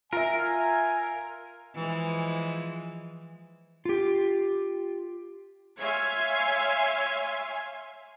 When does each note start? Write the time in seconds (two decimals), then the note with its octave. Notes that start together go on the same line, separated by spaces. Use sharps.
0.13 F4 A#4 E5 G#5
1.75 E3 F3 G#3
3.85 F4 G4
5.78 C#5 E5 F5 G#5 C6